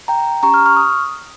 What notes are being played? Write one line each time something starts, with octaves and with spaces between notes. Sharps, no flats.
G5 A#5
C#4 G4 A#5 C#6
C#6 F6
C#6 F6
D#6